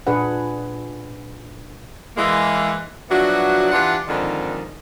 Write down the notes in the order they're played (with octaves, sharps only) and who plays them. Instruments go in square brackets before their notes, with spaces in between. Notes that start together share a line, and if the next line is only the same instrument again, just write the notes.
[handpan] A#2 D4 G#4 B4 F#5
[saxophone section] E3 G#3 A#3
F3 F#3 B3 D4 E4 F#4
E3 D4 F4 G4 B4 F#5
F2 G#2 D3 D#3